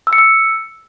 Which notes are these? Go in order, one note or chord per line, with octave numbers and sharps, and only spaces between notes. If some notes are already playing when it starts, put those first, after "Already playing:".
E6
C#7
E6